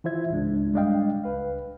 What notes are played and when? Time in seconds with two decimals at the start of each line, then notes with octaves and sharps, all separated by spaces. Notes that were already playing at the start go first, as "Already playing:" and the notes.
0.04 E3 E4 F4 C5 E5 G#6
0.30 C#2 G#2 G#3 D4
0.73 G3 G#3 D4 D#5 F5 G5
1.24 C#2 B4 F5